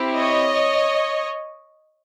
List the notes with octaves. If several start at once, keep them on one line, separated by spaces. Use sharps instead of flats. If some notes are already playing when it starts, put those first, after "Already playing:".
Already playing: C4 E4 G4
C#5 D#5